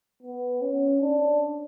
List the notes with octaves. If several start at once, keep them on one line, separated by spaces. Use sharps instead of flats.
B3
C#4
D4